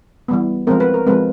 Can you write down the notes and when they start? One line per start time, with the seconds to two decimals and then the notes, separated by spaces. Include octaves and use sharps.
0.28 E3 G3 B3
0.67 F3 G#3 C4 A#4
0.80 B4
0.94 A#4
1.07 F3 G#3 C4 B4